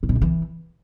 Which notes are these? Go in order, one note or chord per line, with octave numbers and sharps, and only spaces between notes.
A2
B2
G#2
E3